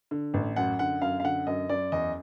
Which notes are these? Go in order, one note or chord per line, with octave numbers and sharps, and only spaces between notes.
D3
A1
F#2 F#5
D3 F#5
F#2 F5
F5
D3 F#5
F#2 D#5
F#2 D5
E2 D#5